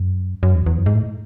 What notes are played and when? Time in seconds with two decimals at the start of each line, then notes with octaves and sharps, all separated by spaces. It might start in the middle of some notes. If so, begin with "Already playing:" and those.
Already playing: F#2
0.43 F#2
0.55 E2
0.66 E2
0.78 F#2
0.86 G#2
0.95 A2